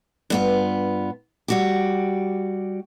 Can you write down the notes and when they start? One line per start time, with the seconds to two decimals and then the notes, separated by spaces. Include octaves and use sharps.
0.30 G2 B3 F4
1.48 G3 F#4 G4